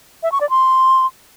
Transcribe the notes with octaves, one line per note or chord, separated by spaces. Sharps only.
E5
C#6
D5
C6